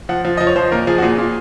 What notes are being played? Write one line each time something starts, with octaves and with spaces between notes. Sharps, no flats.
F3 F#5
F3
F3 D#5
C#5
F3 C5
A#2 A#4
F3 G#4
F#4
A#2 G#4
A#2